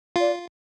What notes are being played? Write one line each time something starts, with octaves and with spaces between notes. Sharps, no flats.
F4 D5